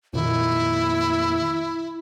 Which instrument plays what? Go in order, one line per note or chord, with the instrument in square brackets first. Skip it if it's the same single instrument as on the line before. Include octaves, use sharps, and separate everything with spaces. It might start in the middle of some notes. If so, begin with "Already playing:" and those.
[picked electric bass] F2 A#2 D#3 [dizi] E4